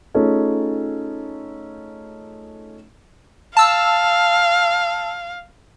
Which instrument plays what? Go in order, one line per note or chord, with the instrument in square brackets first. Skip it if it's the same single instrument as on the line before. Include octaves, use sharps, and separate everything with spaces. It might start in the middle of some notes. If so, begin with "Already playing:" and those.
[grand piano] A3 C#4 D#4 F4 G#4 A4
[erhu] F5 [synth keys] A5 E6